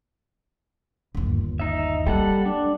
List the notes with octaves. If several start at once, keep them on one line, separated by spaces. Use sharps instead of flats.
G1 D#2
D#4 E5
G3 A#3 A4 F#5
D4